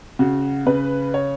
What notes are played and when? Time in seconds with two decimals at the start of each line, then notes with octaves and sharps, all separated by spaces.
0.19 C#3 F#4
0.66 C#3 B4
1.14 C#5